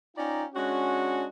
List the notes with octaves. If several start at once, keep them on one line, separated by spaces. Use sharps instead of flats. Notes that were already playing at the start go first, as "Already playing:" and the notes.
C#4 D#4 F4 D5 G5 A#5
G#3 C#4 D4 F#4